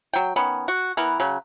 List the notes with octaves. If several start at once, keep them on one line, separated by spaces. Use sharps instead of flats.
F#3 G5
D#3 B3 C#4
F#4
E3 B3 A#4
C#3 F#3